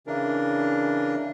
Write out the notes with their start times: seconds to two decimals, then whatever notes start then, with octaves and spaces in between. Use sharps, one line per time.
0.07 C#3 E3 D4 A#4